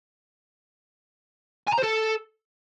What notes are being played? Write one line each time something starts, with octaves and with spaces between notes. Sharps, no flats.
G#5
A#5
C5
A4